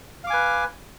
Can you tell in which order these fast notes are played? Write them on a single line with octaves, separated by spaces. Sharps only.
F5 D6 G#5 B4